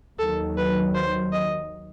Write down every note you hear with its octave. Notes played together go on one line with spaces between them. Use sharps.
D#2 D#3 F#3 A4
B4
C5
D#5